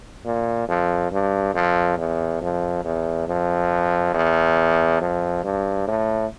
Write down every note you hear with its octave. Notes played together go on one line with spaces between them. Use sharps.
A#2
F2
G2
F2
E2
F2
E2
F2
E2
F2
G2
A2